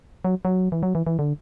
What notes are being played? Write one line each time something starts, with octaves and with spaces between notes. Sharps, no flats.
F#3
F#3
E3
F#3
E3
E3
D3